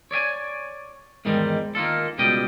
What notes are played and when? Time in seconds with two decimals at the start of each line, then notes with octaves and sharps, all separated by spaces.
0.11 C#5 D5 E5 G#5
1.25 E2 G#2 D#3 G3 G#3
1.75 D#3 A#3 F4 A4
2.18 C#2 B2 G3 G4 D#5 G5